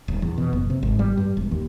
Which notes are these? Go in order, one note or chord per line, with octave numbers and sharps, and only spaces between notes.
D#1
E2
B2
F#1
C3
G#1
G3
G2
E1
D#2